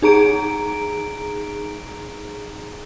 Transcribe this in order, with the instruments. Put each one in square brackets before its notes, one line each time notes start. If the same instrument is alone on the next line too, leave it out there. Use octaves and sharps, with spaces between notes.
[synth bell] D#4 G#4 A#5 D7